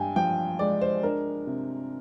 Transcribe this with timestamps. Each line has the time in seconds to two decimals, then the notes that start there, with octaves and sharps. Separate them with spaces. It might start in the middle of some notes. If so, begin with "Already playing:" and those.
Already playing: G2 G5 G#5
0.16 F3 G5
0.59 G#3 D5
0.81 C5
1.03 D4 A#4
1.47 C3